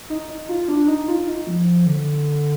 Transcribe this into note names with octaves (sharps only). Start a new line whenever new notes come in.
D#4
D#4
F4
D4
D#4
F4
D#4
F3
D3